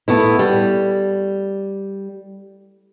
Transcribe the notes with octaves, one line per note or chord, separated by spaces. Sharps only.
A3 B3 E4
G3